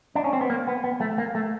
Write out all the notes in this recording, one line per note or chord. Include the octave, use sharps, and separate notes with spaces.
D4
C#4
C4
B3
A#3
B3
B3
A3
A#3
A3